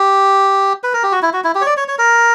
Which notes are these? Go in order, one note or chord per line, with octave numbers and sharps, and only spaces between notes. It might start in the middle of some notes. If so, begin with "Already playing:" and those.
Already playing: G4
B4
A#4
G4
F#4
E4
F#4
E4
G4
C#5
D5
C#5
C#5
A#4